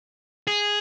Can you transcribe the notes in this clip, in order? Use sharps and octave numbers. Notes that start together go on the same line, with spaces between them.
G#4